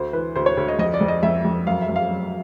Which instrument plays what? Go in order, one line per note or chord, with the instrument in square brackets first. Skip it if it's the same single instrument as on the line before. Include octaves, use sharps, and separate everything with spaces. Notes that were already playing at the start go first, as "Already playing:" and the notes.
Already playing: [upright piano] D2 C5
E3 B4
D2 C5
C#5
D2
D#5
F2 D#5
D5
F2
D#5
F2 E5
F2
F#2 F5
E5
F#2
F5
F#3